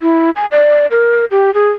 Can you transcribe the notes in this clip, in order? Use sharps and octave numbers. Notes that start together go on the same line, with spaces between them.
E4
G#5
D5
A#4
G4
G#4